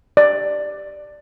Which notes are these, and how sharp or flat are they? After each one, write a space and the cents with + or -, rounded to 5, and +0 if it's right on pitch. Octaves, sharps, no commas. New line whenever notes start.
D5 +10